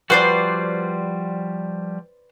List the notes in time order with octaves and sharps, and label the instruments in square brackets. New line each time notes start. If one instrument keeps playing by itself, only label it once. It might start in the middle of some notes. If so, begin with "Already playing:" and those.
[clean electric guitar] F3 G3 F#4 [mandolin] B4 C5 D5